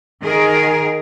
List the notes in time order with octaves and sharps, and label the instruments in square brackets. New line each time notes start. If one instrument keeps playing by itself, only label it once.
[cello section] D#3 G#4 A#4